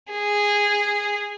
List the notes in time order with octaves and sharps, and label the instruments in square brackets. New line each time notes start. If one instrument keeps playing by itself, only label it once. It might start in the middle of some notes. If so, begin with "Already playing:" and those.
[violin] G#4